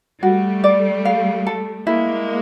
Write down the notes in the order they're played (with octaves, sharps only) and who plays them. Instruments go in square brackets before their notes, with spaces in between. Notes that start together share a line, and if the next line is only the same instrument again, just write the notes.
[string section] G3 A3 [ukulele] F#4
[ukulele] D5
F5
A4
[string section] G#3 A#3 [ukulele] E4